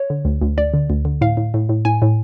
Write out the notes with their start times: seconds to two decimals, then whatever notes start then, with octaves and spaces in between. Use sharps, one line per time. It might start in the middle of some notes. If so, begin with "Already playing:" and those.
Already playing: C#5
0.10 D3
0.25 D2
0.42 D2
0.57 D2 D5
0.74 D3
0.90 D2
1.05 D3
1.21 A2 F5
1.37 A2
1.54 A2
1.69 A2
1.85 A2 G#5
2.02 A2